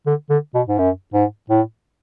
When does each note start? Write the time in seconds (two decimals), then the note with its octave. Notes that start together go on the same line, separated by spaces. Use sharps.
0.06 D3
0.30 D3
0.54 B2
0.68 G#2
0.78 F#2
1.14 G#2
1.50 A2